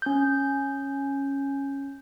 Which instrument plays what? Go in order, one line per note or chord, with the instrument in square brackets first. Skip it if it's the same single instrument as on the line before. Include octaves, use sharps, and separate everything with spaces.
[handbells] C#4 G6